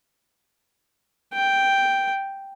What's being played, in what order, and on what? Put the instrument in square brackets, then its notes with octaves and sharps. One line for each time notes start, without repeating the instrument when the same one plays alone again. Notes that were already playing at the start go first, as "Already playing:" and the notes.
[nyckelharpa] G5